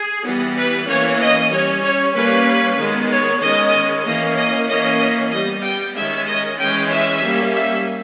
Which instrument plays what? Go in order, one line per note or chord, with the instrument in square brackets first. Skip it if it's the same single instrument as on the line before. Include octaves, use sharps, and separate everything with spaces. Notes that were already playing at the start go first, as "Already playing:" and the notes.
Already playing: [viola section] G#4
E3 G3 B3
B4
E3 A#3 C#4 C#5
D#5
G3 C#4 C#5
C#5
G3 A#3 C#4 B4
D#3 G#3 B3
C#5
D#3 G#3 C#4 D#5
E3 A#3 C#4 D#5
D#5
E3 A#3 C#4 D#5
G3 B3 D#5
G5
D#3 G#3 C#4 E5
D#5
E3 G#3 C#4 G5
E5
G3 A#3 C#4
E5